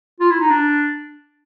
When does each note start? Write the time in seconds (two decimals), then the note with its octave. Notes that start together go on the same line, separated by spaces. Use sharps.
0.20 F4
0.30 E4
0.40 D#4
0.50 D4